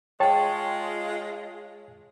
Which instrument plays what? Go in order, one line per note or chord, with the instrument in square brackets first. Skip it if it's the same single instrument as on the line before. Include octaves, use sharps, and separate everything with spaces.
[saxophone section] G#3 F4 [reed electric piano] C#5 A5 C#6 [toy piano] G5